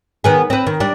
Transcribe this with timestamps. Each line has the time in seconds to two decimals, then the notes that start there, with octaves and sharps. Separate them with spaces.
0.24 D#3 B3 G#4
0.50 C4 B4
0.67 D#3
0.80 G3 D4